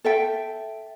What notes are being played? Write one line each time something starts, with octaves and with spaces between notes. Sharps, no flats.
A4 E5 G5